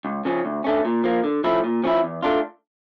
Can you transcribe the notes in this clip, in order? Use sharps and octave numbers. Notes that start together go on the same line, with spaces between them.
C#2
C#3 F3 C#4
D2
D3 A3 C#4
A#2
F3 A#3
D3
F3 A3 C#4 E4
A#2
F3 C#4 E4
E2
D3 A3 D4 F4